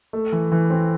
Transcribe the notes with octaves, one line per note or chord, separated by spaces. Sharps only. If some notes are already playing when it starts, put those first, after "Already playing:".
A3
E3
E3
C4